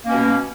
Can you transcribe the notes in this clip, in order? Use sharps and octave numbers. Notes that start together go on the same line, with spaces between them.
B2 A#3 C#4